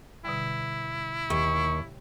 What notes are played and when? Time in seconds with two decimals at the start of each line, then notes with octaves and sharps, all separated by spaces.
0.25 B2 D3 G3 E4
1.30 D#2 C#6